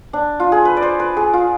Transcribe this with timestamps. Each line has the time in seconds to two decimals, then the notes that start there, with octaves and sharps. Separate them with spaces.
0.13 D4
0.40 F4
0.52 G#4
0.65 B4
0.77 D5
0.82 C5
0.99 B4
1.17 G#4
1.33 F4